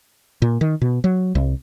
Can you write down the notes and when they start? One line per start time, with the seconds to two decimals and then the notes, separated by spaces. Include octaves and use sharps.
0.42 A#2
0.61 D#3
0.82 B2
1.04 F#3
1.35 C2